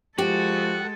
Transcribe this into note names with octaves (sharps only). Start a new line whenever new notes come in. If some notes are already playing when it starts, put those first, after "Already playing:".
F3 G#3 F#4 G4 A4